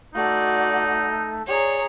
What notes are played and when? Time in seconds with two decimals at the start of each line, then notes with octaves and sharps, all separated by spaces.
0.15 A3 D#4 F#4 D5
1.48 G#4 C#5 D5 A#5